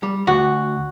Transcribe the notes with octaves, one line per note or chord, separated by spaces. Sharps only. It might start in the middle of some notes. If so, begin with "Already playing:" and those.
G3
D2 F#4